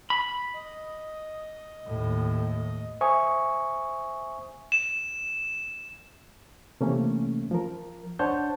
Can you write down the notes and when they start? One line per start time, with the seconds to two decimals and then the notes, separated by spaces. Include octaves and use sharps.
0.10 B5
0.54 D#5
1.86 D#2 A2
3.01 C5 E5 G#5 C#6 D#6
4.72 E7
6.81 C3 E3 A3 A#3 C#4
7.51 F3 A#4
8.19 D4 C5 C#5 F#5 A5 G6